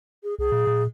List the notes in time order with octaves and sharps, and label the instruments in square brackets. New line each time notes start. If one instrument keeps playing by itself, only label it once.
[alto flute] G#4
[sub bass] C2 [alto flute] G#4
[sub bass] A#2
A#2